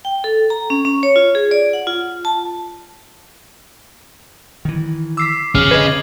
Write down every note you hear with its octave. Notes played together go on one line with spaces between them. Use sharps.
G5
A4
A#5
C#4
C#4
C#5
F4
G#4
D5
F#5
F4
A5
D#3 E3
D6 E6 B6 C7
G#1 F2 C#4 G#4 F6 F#7
D3 B4 D#5 G#6